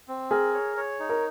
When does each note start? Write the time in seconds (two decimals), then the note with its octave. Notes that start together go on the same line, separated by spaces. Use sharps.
0.08 C4
0.31 G#4 A#4
0.54 C#5
0.77 C#5
1.00 D#4
1.09 A#4